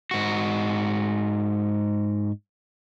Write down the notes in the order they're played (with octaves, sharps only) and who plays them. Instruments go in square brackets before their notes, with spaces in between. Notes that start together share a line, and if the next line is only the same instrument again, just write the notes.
[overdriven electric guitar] G#2 F#4